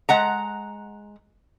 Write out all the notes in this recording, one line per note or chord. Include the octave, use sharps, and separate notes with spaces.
G#3 F#5 A#5